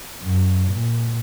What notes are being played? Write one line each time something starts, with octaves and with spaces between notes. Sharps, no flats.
F#2
A#2